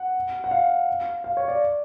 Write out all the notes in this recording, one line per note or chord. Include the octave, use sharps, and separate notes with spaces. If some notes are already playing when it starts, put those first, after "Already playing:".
Already playing: F#5
F#5
F5
F5
C#5
D5